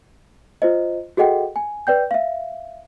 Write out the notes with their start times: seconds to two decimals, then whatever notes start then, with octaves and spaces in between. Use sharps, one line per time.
0.62 F4 C5 D#5
1.17 F#4 G#4 A4 D#5 F#5 G5
1.56 G#5
1.87 B4 D5 G5 G6
2.11 E5 F5